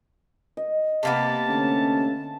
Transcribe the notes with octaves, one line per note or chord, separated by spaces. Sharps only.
D#5
C3 A#3 B3 A5
D3 A3 C#4